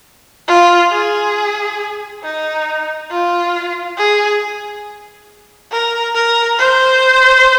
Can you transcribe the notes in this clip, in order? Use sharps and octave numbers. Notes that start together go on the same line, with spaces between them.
F4
G#4
D#4
F4
G#4
A#4
A#4
C5